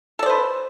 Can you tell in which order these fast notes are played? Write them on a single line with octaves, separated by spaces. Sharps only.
A4 D5 C5 B4